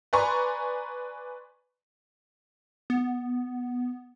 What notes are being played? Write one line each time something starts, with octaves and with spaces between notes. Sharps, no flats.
B4 D5 G#5 A#5 C6 C#6
B3